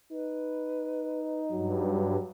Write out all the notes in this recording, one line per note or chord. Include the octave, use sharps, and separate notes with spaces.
D#4 B4
G2 F#3